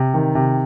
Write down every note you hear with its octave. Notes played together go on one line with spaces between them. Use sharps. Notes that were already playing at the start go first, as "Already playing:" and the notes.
Already playing: C3
D#3
C3